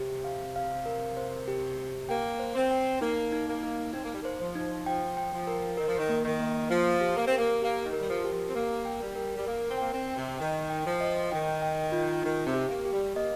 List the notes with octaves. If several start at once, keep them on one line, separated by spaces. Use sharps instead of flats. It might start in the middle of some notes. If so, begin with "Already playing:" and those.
Already playing: C3 G4
F5
F5
A#4
C5
G4
G4
A#3 G5
C5
C4
G5
A#3 D#4
D#4
A#3
D#4
C4 D#4
A#3
G3
A#3 C5
F3
D#4
F3 G5
G5
F3
A#4
D#3 A#4
F3
D#3
A#3
D#3
A#3
F3 F5
G4
A#3
C4
A#4
A#3
A#3 G4
D#3
A#4
G3
F3
G4
F3
C4
A#3 A#4
G5
G3
A#4
G3
A#3 A#4
C4
A#3 G5
C4
G5
C3
D#3 G5
G5
F3
D#5
D#3 G5
G5
F4
D#3 D#4
C3
G4
A#3
G4
G3
A#3 D#5